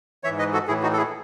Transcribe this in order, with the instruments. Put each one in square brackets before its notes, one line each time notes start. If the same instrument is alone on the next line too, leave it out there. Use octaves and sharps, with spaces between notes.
[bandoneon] E3 C#5 E5
G#2
B4 D#5
F#4 A4
A2 E3 E4 G#4
D#4 F#4
A4
E4 G#4